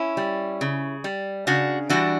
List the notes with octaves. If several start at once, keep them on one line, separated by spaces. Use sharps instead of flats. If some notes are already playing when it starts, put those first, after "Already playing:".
Already playing: C#4 E4
G3
C#3
G3
C#3 D4 F#4
E3 G3 D4 F#4